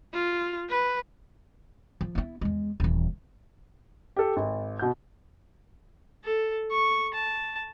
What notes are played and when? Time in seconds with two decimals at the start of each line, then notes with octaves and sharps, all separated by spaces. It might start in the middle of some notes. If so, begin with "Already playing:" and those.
0.14 F4
0.69 B4
2.01 F3
2.15 B3 E4
2.41 E2 G#3
2.80 D#1 E3
4.16 G4 A4
4.36 G#1
4.79 B2 F#4 G6
6.24 A4
6.71 C#6
7.13 A5